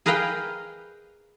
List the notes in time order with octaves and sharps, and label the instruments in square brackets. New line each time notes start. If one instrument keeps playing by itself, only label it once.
[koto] G#4 A#4 B4 D#5 F5 G5